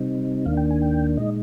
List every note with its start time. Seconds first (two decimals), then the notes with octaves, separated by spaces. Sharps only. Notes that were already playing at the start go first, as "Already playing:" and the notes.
Already playing: C3 G3 C4 D#4
0.46 D#2 D#3 A#3 D4 F5
0.57 G5
0.71 G#5
0.81 G5
1.17 A#2 G#3 D#4 D#5